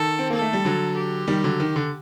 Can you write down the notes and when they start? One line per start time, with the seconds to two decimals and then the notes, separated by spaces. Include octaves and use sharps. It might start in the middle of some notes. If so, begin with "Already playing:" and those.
Already playing: D#3 A4
0.19 C4
0.30 A#3 A4
0.42 A3
0.53 G3
0.65 D3 F#3
0.96 G4
1.28 D#3 G3
1.44 D3 F#3
1.60 D#3
1.76 D3